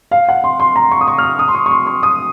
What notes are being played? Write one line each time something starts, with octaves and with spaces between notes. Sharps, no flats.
F5
F#5
C6
C6
A#5
C#6
D#6
C#6
F6
D#6
D#6
C6
C#6
C#6
C6
C#6
D#6